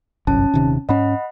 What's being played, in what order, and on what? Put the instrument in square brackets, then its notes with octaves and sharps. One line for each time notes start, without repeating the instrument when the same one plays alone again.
[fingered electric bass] G1 C2 F#2 [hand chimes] C#4 A5
[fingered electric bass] D#1 C3 D#3
[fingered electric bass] G#2 C#4 [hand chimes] D#5 F#5 B5